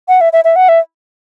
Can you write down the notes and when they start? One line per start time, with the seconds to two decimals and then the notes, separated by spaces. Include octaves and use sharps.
0.08 F#5
0.21 E5
0.33 E5
0.44 E5
0.56 F#5
0.69 E5